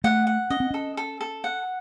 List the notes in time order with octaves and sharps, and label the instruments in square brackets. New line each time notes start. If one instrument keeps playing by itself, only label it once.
[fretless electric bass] A3 [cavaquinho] F#5
[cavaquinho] F#5
[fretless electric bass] C#4 [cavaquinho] D#5
[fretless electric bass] C4
[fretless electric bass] C#4 [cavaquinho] A4
[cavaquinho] A4
A4
F#5